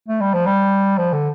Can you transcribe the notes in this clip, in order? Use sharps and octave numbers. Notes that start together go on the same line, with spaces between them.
A3
G3
F3
G3
F3
D3